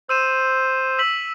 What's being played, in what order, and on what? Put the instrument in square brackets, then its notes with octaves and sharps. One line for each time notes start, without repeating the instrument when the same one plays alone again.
[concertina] C5 [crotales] E6 D#7 E7
[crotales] E6 B6 F#7